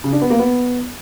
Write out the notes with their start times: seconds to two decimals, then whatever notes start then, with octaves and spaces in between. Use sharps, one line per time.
0.04 C#3
0.13 D4
0.21 B3
0.30 A#3
0.39 B3